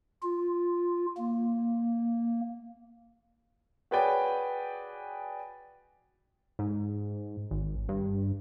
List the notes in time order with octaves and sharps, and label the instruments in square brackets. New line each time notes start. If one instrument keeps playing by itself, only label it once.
[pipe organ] F4
A#3
[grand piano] F#4 G#4 B4 C#5 D5 G5
[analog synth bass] G#2
G#1
G2